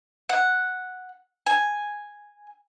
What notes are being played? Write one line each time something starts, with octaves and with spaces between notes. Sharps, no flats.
F#5
G#5